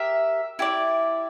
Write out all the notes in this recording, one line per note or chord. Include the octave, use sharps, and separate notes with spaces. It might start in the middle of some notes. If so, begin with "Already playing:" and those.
Already playing: G4 A#4 E5
E4 G4 D5